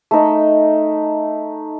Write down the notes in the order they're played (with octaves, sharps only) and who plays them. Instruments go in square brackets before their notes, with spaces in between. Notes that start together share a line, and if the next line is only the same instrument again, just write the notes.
[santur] A3 D#4